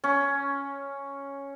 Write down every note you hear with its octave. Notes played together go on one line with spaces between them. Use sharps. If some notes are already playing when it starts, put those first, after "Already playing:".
C#4